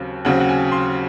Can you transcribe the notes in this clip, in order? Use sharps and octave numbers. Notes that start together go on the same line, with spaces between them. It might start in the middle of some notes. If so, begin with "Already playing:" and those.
Already playing: D#2 C#3 F#3 C4
D#2 C#3 F#3 C4 F#5
F#5
G#5
C6